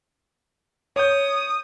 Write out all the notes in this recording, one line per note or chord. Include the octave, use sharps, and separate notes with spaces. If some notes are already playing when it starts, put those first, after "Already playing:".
C#5 D#6 G6